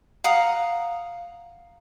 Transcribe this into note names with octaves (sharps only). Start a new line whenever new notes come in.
F5 F#5 A#5 D#6